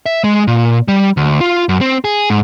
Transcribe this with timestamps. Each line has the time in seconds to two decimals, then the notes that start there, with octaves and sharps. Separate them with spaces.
0.06 E5
0.24 G#3
0.47 A#2
0.88 G3
1.17 D2
1.41 F4
1.69 F#2
1.81 C4
2.05 G#4
2.30 G#2